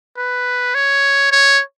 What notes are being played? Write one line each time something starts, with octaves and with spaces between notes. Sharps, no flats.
B4
C#5
C#5